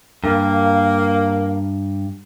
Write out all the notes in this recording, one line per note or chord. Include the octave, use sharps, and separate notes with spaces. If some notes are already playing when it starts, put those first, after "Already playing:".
G2 A#3